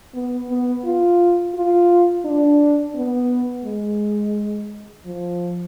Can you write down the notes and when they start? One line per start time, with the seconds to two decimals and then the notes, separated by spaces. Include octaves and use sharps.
0.14 B3
0.50 B3
0.85 F4
1.55 F4
2.25 D4
2.95 B3
3.65 G#3
5.05 F3